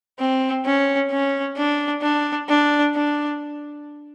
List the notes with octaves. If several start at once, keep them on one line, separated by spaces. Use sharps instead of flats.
C4
C#4
C#4
D4
D4
D4
D4